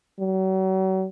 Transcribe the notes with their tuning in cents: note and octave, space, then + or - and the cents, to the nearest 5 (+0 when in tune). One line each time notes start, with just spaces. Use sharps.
F#3 +40